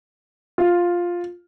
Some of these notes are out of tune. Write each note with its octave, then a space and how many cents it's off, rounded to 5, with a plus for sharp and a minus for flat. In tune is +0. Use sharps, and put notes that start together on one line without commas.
F4 +5